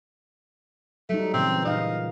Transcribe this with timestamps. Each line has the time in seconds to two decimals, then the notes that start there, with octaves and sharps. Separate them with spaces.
1.09 F#3 G3 A3 D#4
1.34 A#2 C#3 E3 C4
1.65 A#2 D#4 F5